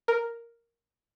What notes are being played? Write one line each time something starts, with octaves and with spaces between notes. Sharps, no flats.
A#4